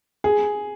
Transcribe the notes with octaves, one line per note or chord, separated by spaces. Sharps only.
G#4